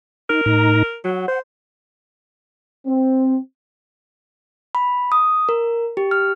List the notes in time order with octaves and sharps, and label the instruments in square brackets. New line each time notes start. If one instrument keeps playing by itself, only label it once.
[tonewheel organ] D#4 [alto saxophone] A#4
[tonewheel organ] A2 D#4 A#5
[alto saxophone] F#3 [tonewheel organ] F#5
[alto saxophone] C5
[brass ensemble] C4
[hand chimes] B5
D#6
A#4
G4
F6